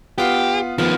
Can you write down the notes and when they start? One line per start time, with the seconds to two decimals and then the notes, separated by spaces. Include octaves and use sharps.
0.18 B3 F4 G4
0.78 D#3 F3 B3